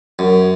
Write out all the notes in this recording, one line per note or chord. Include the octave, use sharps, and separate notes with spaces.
F#2